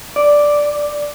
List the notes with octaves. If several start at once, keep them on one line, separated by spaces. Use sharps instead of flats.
D5